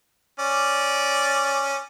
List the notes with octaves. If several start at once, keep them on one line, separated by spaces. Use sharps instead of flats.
C#4 D5